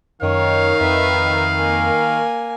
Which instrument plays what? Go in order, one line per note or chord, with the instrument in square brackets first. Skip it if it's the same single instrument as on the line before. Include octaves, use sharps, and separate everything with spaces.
[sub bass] F#2 [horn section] D#3 [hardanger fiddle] C#5 [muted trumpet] F5
[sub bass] F2 [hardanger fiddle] B4 E5
[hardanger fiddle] A#3 G#5